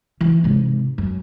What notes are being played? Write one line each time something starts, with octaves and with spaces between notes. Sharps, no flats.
E3
G#2 C3
F#2